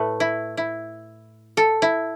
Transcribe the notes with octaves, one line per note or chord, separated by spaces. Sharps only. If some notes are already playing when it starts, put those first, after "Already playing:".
Already playing: A2 A3 B4
E4
E4
A4
E4